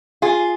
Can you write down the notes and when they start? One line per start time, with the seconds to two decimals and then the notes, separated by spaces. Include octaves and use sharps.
0.22 F4 G#4